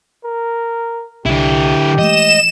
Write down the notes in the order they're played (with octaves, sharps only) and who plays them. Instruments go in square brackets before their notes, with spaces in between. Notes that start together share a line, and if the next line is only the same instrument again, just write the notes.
[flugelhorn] A#4
[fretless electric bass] C2 [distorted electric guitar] D3 E4 [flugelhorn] G4
[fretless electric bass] E3 G#3 A3 [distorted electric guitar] D#5 [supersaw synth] E7